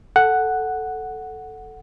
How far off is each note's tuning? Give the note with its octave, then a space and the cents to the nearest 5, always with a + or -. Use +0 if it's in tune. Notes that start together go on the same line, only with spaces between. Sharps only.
A4 +0 F#5 +0